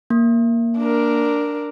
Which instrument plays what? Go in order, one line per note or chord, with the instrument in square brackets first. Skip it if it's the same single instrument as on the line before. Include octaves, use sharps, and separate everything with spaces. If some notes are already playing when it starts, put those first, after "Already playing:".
[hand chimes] A#3
[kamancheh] D4 A#4